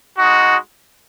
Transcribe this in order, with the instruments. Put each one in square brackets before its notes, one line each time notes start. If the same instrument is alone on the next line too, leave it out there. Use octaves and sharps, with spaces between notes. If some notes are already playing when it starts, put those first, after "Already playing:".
[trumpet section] G#3 D#4 F#4